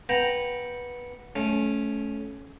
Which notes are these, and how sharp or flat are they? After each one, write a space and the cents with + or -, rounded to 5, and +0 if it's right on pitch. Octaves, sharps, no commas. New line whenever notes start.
B3 -15 G5 +0 A#5 +0
A3 -25 C#4 +0